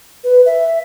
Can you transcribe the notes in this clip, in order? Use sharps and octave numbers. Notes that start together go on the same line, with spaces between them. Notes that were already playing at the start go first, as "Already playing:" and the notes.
B4
E5